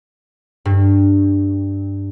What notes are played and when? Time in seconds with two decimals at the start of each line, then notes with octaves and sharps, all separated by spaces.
0.65 G2